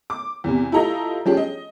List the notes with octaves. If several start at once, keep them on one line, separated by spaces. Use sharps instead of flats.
D6
E2 C3
E4 F4 G4 A4 D#5 A#5
F3 C#4 D4 G4 G#4
D#5